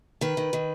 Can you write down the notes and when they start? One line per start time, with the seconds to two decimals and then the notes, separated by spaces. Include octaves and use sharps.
0.21 D#3 B4
0.37 D#3
0.53 D#3